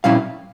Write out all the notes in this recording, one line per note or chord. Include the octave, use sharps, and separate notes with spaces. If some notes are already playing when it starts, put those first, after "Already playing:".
A#2 G3 C#4 E4 F5